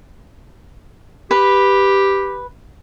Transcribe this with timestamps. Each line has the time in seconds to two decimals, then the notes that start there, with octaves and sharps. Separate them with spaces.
1.31 G4 B4